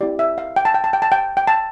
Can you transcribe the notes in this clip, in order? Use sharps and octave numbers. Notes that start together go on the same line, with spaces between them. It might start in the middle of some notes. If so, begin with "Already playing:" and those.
C4 E4 G4 D5
E5
F5
G5
A5
G5
A5
G5
A5
G5
G5
A5